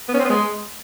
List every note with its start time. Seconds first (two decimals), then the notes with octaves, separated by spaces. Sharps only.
0.09 B3
0.14 C#4
0.19 C4
0.24 B3
0.30 G#3